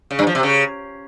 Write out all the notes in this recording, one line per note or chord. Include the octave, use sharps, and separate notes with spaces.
C#3
G2
F3
C3
C#3